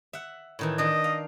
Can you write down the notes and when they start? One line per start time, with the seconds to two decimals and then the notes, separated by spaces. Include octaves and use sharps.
0.13 E5 F#5
0.59 A2 D#3 E3
0.78 D#3 D4 D#5
1.04 F5